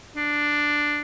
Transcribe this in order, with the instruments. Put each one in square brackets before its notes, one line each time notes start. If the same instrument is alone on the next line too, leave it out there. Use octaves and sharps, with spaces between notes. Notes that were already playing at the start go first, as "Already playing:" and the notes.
[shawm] D4